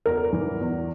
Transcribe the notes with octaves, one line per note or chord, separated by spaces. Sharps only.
E2 A#4
E3
E2